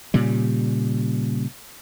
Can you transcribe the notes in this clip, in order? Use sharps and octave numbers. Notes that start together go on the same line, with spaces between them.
A#2 C#3 G3